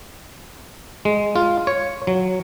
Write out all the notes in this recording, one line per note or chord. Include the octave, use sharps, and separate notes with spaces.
G#3
F4
C#5
F#3